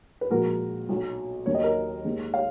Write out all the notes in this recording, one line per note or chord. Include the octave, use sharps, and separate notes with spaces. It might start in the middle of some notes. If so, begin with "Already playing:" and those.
B4
A#1 A#2 G#3 F#4 A#4
B1 B2 F#3
D#2 D#3 F#3 C#5
D#5
A#4 C#5
D#2 D#3 G#3
C#5 F5